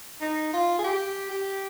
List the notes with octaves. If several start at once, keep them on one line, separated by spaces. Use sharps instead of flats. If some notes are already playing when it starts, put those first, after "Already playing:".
D#4
F4
G#4
G4
G4